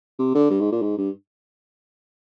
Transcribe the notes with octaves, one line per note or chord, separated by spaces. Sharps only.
C3
D3
G2
G#2
A#2
G#2
G2